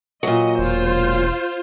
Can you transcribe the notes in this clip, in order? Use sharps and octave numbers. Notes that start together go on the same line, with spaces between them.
A#2 F#3 D#5
E1 F4 C5